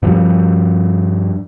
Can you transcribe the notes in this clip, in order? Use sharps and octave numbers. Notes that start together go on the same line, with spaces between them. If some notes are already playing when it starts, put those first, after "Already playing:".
G2 F3 G3